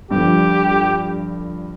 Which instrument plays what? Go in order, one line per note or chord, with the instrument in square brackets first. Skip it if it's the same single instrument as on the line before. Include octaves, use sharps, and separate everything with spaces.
[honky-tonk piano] G2 D3 F3 [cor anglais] G4